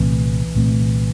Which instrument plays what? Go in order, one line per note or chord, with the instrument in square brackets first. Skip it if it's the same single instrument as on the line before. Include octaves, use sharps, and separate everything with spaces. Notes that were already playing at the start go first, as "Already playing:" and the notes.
Already playing: [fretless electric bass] C2 A#2 A3 C4 [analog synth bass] E3
[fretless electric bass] C2 A#2 A3 C4